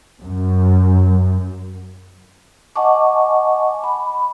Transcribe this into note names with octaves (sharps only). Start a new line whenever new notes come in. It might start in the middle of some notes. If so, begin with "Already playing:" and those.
F#2
D#5 F#5 G#5 A5 C#6 D6
B5